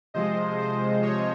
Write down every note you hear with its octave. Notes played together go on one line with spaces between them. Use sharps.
C3 F3 G#3 C5 D#5
C5
C#5